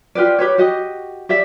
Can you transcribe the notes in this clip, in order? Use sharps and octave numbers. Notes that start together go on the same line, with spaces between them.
F4 G4 B4 D5
G4 B4 C#5
F#4 G4 D#5
G4 D5 E5